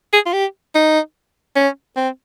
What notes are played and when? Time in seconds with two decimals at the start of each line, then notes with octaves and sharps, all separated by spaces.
0.13 G#4
0.26 F4
0.33 G4
0.75 D#4
1.56 C#4
1.96 C4